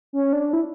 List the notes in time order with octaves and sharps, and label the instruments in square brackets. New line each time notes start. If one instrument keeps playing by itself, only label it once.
[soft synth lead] C#4
D4
E4